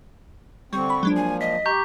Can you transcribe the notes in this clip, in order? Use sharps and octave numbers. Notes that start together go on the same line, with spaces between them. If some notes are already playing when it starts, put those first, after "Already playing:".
D3 G3 C4 C#6
B5
A#2 F3 F#3 G#3 D4
G#5
D#5 B6
G4 A#5 C#6 G6